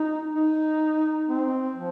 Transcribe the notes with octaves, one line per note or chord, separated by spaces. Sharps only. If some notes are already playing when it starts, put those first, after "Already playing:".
Already playing: D#4
D#4
C4
F3